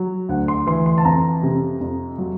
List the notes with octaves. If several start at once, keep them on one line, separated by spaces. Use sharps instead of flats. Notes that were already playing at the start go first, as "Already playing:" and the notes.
Already playing: F#3
D2 F#5
C6
E3 C6
C6
A5
F2 A#5
C3
F2
F#3